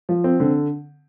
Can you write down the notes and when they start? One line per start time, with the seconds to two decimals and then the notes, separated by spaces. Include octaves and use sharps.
0.09 F3
0.24 C4
0.40 D3